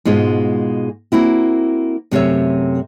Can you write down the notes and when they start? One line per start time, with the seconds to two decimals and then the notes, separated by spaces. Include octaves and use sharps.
0.05 G#2 B2 G#3 F4
1.12 A#3 C4 E4 F#4
2.11 F#2 C3 A3 C#5 E5